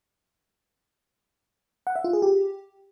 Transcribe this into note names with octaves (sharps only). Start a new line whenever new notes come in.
F#5
E5
F4
G#4
G4